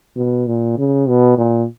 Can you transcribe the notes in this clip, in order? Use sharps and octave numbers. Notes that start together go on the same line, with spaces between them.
B2
A#2
C#3
B2
A#2